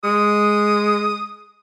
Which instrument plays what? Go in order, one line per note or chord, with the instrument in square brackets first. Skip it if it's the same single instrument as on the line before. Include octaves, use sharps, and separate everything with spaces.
[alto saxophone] G#3 [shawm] D#6